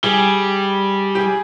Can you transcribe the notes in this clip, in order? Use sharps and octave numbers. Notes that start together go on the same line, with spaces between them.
G3 G#4
G4
G#4